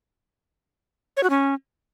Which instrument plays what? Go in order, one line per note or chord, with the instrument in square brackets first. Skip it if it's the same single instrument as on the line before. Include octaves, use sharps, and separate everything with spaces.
[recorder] C#5
F#4
C#4